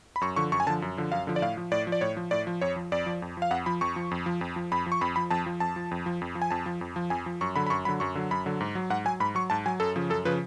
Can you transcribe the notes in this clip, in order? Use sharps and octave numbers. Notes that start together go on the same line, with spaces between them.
B5
F#2 C#6
D3 F3 C#6
F#2 C#6
G#5
D3 F3 A5
F#2
D3 F3
F#2 F5
D3 F3
D5
A2 F5
F3
A2 D5
F3
D5
A2 C#5
F3
A2 D5
F3
F2 C#5
F3
F2 D5
F3
F2
F3 F5
F2 F#5
F3 B5
F2 C#6
F3
F2
F3
F2
F3
F2 B5
F3
C#6
F2 B5
F3 B5
F2 A5
F3
F2 A5
F3
F2
F3
F2
F3
G#5
F2 A5
F3
F2
F3
F2 G#5
F3
F#2 C#6
D3 F#3 B5
B5
F#2 C#6
D3 F#3 B5
F#2 C#6
D3 F#3
F#2 B5
D3 F#3
G#2
F#3
G#2 F#5
F#3 G#5
G#2 B5
F#3 C#6
G#2 A5
F#3 G#5
F#2 A4
C#3 F3
F#2 A4
C#3 F3 B4